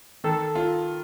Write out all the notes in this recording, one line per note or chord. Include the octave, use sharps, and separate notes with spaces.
D#3 A4
F4